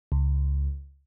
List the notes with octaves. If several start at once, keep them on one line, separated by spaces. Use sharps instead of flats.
C#2